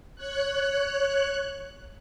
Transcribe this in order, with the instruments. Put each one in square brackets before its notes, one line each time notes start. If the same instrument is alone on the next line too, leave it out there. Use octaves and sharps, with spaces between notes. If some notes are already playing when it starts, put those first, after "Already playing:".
[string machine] C#5 F#6